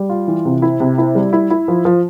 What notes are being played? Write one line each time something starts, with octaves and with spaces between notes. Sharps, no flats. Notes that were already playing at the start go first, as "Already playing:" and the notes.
Already playing: G3
F4
E3
C3
E4
C3
E4
G3
E4
E4
F3
F3